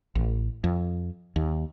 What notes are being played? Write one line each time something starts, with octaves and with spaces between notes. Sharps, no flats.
A1
F2
D#2